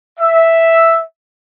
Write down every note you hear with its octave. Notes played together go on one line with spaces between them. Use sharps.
E5